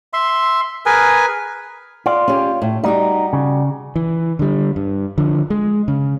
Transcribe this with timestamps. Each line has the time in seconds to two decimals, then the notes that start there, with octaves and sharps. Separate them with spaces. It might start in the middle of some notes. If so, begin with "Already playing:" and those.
0.13 E5 C6
0.86 G#4 A#4 B4 G#5
2.06 F4 D5
2.28 C#4 G4
2.62 A2
2.84 G3 D#4 F#4 G4
3.33 C#3
3.96 E3
4.39 D3 G3
4.76 G2
5.18 D3 F3
5.50 G#3
5.88 C#3